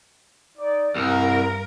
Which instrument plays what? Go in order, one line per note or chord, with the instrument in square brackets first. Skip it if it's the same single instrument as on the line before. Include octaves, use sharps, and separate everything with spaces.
[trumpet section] D#4 D5
[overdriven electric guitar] C2 [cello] G2 A#4 [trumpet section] E5 F5 A#5